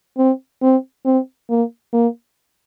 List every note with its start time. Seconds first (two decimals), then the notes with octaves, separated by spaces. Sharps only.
0.17 C4
0.62 C4
1.05 C4
1.49 A#3
1.93 A#3